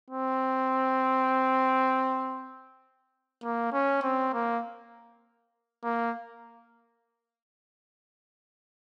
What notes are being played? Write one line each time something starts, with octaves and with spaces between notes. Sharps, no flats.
C4
A#3
C#4
C4
A#3
A#3